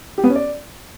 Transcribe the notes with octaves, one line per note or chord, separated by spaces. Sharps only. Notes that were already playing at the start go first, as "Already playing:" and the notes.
G4
B3
C#4
D5